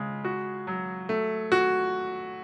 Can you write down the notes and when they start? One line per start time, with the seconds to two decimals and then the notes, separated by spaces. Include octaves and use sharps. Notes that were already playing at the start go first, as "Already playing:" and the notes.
Already playing: C#3 G#3
0.25 F#4
0.67 F#3
1.09 A3
1.52 F#4